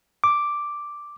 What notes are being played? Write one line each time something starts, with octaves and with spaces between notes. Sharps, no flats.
D6